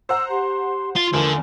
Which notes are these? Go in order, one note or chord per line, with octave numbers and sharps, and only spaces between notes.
C5 F#5 A#5 E6
G4 C6
F4 C6
E2 D3 F3 A3 A#4